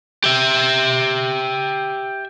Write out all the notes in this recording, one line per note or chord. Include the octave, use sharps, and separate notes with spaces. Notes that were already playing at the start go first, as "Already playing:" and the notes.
G4 E5